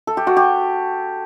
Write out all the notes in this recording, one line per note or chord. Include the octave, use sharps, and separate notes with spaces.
A4
G4
F#4
G4